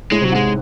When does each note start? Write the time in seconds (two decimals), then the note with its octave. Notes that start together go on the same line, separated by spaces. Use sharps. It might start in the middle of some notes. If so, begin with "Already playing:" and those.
0.11 A2 G#3
0.21 C3
0.24 F#3
0.32 G#2
0.35 G#3